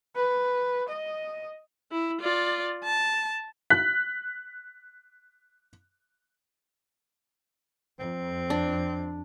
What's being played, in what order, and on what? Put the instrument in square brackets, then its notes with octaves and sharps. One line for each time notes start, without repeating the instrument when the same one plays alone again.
[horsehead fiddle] B4
D#5
[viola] E4
F4 D5
A5
[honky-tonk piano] F#6 B6
[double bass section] F2 [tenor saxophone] C4
[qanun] D4